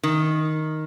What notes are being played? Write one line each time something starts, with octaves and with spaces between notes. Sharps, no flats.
D#3